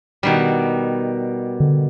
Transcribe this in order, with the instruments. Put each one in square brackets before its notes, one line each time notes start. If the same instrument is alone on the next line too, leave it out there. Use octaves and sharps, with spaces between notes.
[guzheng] B2 D#3 G3
[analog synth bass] D3